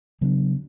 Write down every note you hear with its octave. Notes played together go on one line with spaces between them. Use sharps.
C#3 F#3 B3 D4